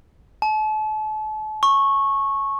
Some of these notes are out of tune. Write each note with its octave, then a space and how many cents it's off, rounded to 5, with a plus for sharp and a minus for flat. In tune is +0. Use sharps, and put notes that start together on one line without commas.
A5 -35
C#6 -15